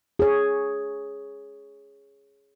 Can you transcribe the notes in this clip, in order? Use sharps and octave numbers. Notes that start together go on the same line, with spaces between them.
G#4 C#5